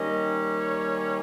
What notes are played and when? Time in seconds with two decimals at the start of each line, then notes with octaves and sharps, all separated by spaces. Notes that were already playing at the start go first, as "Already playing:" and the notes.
Already playing: D#3 G3 A#3 C#4 D#5
0.59 C#5